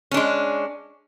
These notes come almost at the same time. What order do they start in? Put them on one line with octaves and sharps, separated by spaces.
C#4 D4 G#3